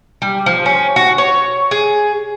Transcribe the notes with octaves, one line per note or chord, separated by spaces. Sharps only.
G3
F3
C#4
F#4
C#5
G#4